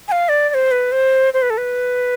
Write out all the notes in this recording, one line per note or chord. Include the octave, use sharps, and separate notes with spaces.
G#5
F5
D5
D5
C5
B4
C5
C5
B4
A4
B4